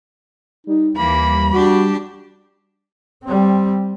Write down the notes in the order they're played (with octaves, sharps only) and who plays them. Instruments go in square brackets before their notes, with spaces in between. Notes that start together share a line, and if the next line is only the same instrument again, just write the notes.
[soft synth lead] G3 [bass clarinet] D#4
[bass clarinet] D#2 [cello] E3 A#3 [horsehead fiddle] B5
[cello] D4 G4 [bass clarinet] F#4
[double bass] G3 C4